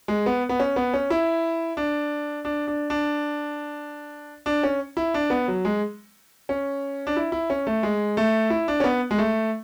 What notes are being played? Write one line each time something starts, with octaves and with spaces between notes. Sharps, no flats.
G#3
B3
B3
C#4
B3
C#4
E4
D4
D4
D4
D4
D4
C#4
E4
D4
B3
F#3
G#3
C#4
D4
E4
E4
C#4
A3
G#3
A3
E4
D4
C#4
B3
G#3
A3